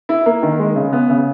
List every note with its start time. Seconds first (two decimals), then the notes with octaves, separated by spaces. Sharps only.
0.09 E4
0.26 A#3
0.43 D#3
0.59 G#3
0.76 C#3
0.93 B3
1.10 C#3